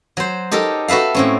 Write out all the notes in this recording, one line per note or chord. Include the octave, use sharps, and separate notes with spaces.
F#3 C5
D#4 G4 A4 A#4
F#4 A4 B4 E5 F5
A2 C4 C#4